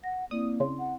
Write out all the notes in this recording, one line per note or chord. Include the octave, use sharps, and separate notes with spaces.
F#5 A#6
A#3 C4 E4 D5 D#6
C#3 C6
F#5